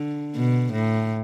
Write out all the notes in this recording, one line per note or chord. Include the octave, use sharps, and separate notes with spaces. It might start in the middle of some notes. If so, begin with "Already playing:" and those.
Already playing: D3
B2
A2